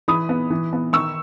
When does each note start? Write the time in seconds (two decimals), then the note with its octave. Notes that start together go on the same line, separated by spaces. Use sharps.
0.08 E3 B5 D#6
0.29 B3
0.50 E3
0.73 B3
0.93 D#3 C#6 E6